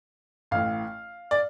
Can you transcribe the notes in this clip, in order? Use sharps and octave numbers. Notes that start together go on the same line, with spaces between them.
A1 A2 F5
D5